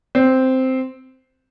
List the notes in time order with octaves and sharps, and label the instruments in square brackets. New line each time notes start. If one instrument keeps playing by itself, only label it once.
[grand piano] C4